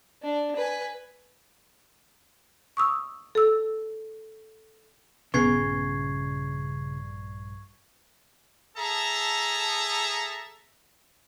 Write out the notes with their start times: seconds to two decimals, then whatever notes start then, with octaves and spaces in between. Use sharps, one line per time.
0.23 D4
0.57 B4 G#5
2.77 C#6 D#6 E6
3.35 A4 E6
5.34 A#1 G2 C#3 B3 C#6 G#6 C7
8.76 G#4 A4 E5 A5 A#5